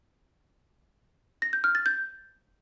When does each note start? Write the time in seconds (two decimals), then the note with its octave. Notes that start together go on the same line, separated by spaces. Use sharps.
1.42 A#6
1.53 G6
1.64 F6
1.75 A6
1.86 G6